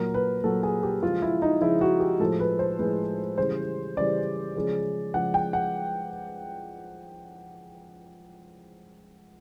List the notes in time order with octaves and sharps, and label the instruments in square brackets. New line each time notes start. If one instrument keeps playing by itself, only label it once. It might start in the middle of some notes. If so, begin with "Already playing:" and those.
Already playing: [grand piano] A#2 F#3 A#4
B4
A#2 F#3 A4
G#4
G4
C#3 F3 G#3 F4
E4
D#4
C#3 F3 G#3 E4
F#4
G4
A2 F3 G#3 A4
B4
C5
A2 F3 G#3 B4
C#3 E3 G3 C5
C#3 E3 G3 D5
C#3 F3 G#3
C#3 F3 G#3 F#5
G5
F#5